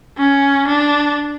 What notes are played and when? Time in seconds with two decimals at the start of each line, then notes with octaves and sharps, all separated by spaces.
0.18 C#4
0.67 D4